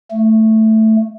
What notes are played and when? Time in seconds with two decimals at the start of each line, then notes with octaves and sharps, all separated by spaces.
0.10 A3